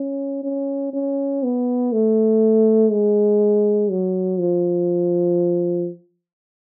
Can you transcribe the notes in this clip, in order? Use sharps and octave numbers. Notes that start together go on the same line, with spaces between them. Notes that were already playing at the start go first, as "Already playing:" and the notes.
Already playing: C#4
C#4
C#4
B3
A3
G#3
F#3
F3